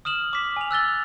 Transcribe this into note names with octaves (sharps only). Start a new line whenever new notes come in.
D#6 F6 E7 F#7
D6 B6
G#5 F7
E6 F#6 A6 G7